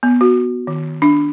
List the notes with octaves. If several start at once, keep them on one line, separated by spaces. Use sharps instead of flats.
B3
F#4
D#3
D4